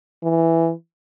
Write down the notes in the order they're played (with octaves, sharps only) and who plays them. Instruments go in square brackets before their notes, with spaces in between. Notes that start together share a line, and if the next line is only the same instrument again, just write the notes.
[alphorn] E3